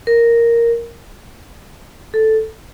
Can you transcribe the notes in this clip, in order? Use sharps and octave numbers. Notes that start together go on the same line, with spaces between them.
A#4
A4